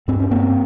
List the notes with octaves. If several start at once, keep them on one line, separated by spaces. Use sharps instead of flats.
G2 C4
C#4
A#3 C4